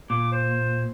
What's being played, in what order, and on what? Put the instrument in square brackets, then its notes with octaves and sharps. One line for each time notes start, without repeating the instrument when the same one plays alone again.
[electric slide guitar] A#2 [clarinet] D6
[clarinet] C5